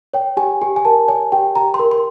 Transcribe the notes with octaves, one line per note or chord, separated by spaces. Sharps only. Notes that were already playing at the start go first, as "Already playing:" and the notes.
C#5 G5
G4 G#5
G4 G#5
G#5
A#4 A5
C#5 G#5
G4 G5
G4 A#5
C6
A#4
C6